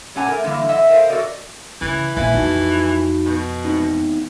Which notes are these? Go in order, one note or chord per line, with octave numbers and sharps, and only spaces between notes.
A#2 C#4 G4 F#5 G#5 A#5
A3 A#4
D3 E3 G3 A#3
D#5 E5 F#5
A#4 C5 D#5 F5
F#4 A4 A#4 D5 D#5
C#3 E3
A#1 C3 E3 E5 G#5
F2 D#4 F#4 A5
B2
E2 C4 D#4